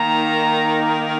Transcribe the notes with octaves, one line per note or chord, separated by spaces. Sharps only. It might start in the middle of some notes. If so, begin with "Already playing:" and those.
Already playing: D#3 A#3 D#4 A#5